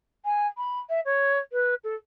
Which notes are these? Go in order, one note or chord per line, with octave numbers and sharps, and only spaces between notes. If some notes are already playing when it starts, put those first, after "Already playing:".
G#5
B5
E5
C#5
B4
A4